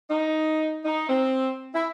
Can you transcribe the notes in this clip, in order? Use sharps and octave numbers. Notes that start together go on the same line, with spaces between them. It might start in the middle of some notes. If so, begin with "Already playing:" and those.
D#4
D#4
C4
E4